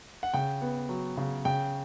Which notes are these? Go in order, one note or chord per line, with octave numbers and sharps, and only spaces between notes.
F#5
C#3 G5
B3
F#3
C#3
C#3 G5